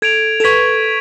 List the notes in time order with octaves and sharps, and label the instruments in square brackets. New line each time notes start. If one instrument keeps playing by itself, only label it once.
[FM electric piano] A4 [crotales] G#6 D7 F7
[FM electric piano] A4
[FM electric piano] B4 [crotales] C#6 G#6 B6